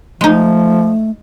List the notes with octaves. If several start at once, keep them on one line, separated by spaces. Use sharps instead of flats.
F3 G#3 A3 D#4